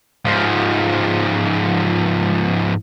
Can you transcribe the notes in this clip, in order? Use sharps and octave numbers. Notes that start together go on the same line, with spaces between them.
G#2 F3